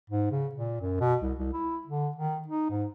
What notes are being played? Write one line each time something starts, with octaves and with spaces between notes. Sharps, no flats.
G#2
C#3
A#2
F#2
B2
C2
C2
E4
D3
D#3
D#4
G#2